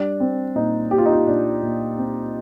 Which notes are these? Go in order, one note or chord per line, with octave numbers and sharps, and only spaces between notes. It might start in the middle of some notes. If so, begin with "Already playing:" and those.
Already playing: G3 D4
C4
A#2 D#4
A#2 G4
F4
D#4
F4
A#2 D4
A#2
C4